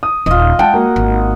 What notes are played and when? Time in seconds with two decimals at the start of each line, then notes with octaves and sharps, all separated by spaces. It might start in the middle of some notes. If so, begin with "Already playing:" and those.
0.03 D#6
0.26 D#1 C#4 F4 D#5
0.59 G#3 F#5 G5 A5
0.74 A#3 F#4
0.96 G#1